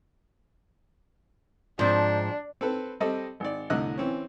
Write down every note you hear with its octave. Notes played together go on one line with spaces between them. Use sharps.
G#2 F3 C4 D4
C4 A4 B4
G3 C4 A4 D#5
G#1 D5
C2 A2 D3 D#5 E6 F#6
E3 C4 C#4